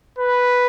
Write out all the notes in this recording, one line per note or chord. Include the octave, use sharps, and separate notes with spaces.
B4